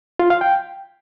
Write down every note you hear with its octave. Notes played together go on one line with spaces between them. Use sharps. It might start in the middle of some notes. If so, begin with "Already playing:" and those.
F4
F5
G5